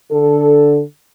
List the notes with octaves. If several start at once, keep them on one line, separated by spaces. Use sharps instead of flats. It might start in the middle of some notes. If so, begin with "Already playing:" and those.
D3 A4